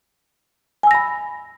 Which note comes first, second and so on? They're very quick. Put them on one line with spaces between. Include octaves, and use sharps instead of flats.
G#5 E6 A#6 B5